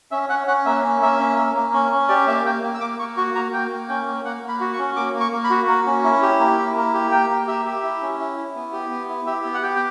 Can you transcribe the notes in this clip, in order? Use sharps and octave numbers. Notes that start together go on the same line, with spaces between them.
C#4 E5
C#4 F#5
C#4 F#5
A#3 E5
C#4
A#3 E5
C#4
A#3
A#3
C#4
C#4
G4 D5
A#3 E5
A#3 G5
A#3
E6
A#3 D6
A#3 C#6
F#4 C#6
A#3 A#5
A#3 G5
A#3
C#4 G5
A#3
A#3 F#5
A#3
B5
F#4
C#6
C#4
A#3 D6
A#3
C#6
A#3
B5
F#4
A#3
C#4
E4
G4
A#3
E4
A#3
G4
A#3 G5
A#3
G4 E5
G4
E4
C#4
E4
E4
B3
G4
B3
E4
G4 E5
B3
F#5
G4 G5
G5